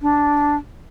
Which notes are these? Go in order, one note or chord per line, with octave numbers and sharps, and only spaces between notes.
D4